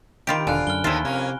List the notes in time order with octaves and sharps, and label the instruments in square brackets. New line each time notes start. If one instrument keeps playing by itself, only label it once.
[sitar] C3 [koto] D#3 F4 G4 [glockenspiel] B5 D7
[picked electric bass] E1 [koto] D3 [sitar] F4 [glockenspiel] G#5 F#6
[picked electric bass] F#2 [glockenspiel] F6 G7
[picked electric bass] D#2 D#3 [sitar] A2 F3 A3 [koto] E4 F4
[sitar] F2 A#3 C#4 [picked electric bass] C3